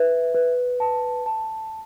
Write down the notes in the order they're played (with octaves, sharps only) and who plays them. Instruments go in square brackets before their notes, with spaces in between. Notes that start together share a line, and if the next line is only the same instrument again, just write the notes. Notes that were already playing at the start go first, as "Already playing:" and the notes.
Already playing: [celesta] B4 E5
B4
A5
A5